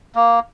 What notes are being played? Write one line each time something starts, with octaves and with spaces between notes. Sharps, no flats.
A#3